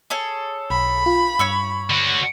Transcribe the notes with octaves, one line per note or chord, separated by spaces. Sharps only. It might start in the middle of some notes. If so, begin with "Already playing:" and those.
G#4 A4 C#5
B1 B5
F4
G2 C#5 C#6 E6
D3 F#4